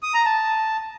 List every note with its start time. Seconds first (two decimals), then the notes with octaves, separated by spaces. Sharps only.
0.03 D#6
0.14 A#5
0.25 A5